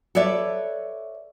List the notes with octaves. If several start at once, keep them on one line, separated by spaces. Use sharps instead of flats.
A4 B4 C#5 D5 E5